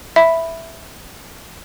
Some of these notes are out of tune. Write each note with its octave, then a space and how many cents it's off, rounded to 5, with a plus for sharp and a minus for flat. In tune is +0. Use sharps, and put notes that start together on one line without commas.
E5 +0 B5 +0